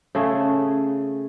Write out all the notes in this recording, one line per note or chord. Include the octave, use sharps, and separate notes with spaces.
C#3 A3 G#4